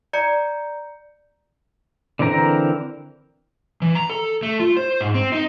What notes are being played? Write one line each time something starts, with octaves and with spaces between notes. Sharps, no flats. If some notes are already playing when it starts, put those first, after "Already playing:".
D5 A#5 G6 C#7
D3 E3 C4 A#4 A#5
E3
A#5
A4
A3
F4
C5
G#2
C4
D#4